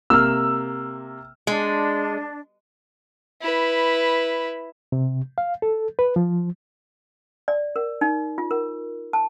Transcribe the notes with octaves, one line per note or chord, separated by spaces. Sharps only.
C3 A#3 E6 F6
G#3 D4
E4 B4
C3
F5
A4
B4
F3
D5
A#4
D#4
F4
A#4
A5